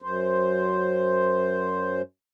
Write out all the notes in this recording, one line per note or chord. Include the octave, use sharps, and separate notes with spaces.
F#2 C5